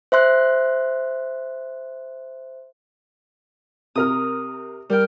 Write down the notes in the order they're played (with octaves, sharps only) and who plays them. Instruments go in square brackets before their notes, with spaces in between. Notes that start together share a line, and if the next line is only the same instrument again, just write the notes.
[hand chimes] C5 E5 C6 F#6
[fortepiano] C3 A#4 F6 [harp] D#6
[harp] G3 G5 [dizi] A#4